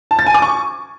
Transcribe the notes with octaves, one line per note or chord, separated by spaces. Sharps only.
A5
A6
G#5
D6
C#6